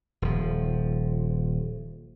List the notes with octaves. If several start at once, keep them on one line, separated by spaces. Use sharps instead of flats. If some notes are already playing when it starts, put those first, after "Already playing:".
D#1 F3